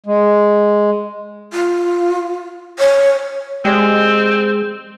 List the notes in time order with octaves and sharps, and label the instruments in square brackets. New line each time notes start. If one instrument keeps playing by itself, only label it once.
[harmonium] G#3
[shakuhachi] F4
C#5
[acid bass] G#3 [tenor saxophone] C4 [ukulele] G4 D5